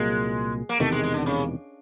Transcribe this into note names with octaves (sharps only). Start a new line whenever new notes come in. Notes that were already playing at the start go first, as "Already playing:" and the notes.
Already playing: C2 A#2 F#3 G#3 A#3
A#3
E1 E2 C3 D#3 A3
G#3
G#3
D3
C#3